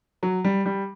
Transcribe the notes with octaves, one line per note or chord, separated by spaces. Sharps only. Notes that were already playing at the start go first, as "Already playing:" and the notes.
F#3
G3
G3